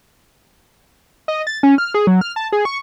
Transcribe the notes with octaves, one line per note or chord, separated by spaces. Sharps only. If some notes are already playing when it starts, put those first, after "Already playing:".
D#5
A6
C#4
F6
G#4
F#3
F6
A5
G#4
C#6